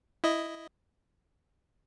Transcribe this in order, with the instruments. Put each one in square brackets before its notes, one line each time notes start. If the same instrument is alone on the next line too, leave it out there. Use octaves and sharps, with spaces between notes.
[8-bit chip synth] E4 D#5